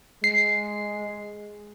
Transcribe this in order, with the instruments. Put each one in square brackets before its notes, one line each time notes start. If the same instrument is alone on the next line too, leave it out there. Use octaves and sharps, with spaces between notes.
[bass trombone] G#3 [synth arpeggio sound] C7